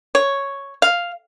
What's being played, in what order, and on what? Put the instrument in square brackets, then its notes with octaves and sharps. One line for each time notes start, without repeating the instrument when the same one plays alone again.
[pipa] C#5
F5